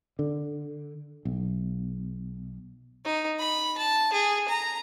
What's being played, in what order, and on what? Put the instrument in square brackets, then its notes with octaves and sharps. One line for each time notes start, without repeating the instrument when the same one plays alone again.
[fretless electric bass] D3
B1
[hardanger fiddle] D#4
B5
A5
G#4
A#5